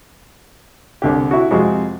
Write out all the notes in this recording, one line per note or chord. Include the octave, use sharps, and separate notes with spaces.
C2 D3 G4
E4 F#4
F2 C3 G#3 F#4